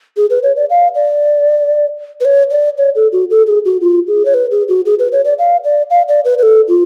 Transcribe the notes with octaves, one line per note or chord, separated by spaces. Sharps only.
G#4
B4
C#5
D5
F5
D5
B4
C#5
D5
C#5
A4
F#4
A4
G#4
F#4
F4
G#4
C#5
B4
G#4
F#4
G#4
B4
C#5
D5
F5
D5
F5
D5
B4
B4
A4
F4